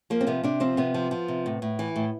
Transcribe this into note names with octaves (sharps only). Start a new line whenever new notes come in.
F3 A#3
C4
C3 B3
C3 D4
F3 C4
C3 B3
F3
F3
C3
A2
A2
E3
A2